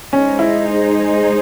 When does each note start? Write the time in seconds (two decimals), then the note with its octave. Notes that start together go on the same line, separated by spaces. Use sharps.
0.13 G#3 C#4 D#4 G#4 C5 D#5
0.39 E4